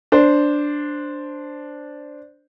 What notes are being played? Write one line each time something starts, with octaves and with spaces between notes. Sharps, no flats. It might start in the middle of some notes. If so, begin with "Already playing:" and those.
D4 C5